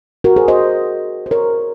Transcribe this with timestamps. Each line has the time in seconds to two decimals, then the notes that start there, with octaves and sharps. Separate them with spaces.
0.24 F#4 A#4
0.36 G#4 C5
0.48 C5 D#5
1.26 C5
1.31 A#4 C#5